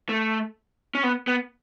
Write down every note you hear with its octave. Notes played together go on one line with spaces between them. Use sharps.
A3
C#4
B3
B3